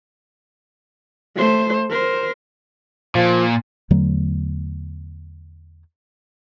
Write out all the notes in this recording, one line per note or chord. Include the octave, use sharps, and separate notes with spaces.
A3 C5
A#4 C5
A#2 F3
E2 D3 F#3 A3